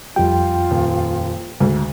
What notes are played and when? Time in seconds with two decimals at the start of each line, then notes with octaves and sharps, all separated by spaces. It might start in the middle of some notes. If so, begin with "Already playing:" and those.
0.16 F2 G3 F4 G5
0.71 D#1
1.60 D2 G#2